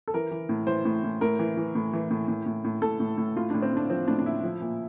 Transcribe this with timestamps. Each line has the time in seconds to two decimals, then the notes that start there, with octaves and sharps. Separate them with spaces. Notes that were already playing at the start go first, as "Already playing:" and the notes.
0.08 A4
0.14 E3 A#4
0.31 E3
0.49 A2
0.67 E3 C5
0.85 A2
1.04 A2
1.21 A2 A#4
1.39 E3
1.57 E3
1.75 A2
1.93 E3
2.11 A2
2.28 A2
2.46 A2
2.64 A2
2.82 A2 A4
3.00 A2
3.17 A2
3.36 A2 F4
3.50 A2 D4
3.62 C4
3.72 A2 D4
3.90 F3 C4
4.08 A2 D4
4.19 D4
4.26 A2 E4
4.43 F3
4.61 A#2